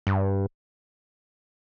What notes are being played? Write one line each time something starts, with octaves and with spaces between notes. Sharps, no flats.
G2